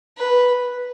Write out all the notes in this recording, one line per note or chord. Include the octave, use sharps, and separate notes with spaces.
B4